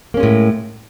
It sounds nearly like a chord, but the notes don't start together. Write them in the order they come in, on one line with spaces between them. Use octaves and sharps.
A#3 C#4 G#3 A2